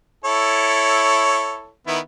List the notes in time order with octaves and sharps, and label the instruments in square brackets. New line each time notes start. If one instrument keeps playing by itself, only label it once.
[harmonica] E4 A4 C#5
D#3 B3 E4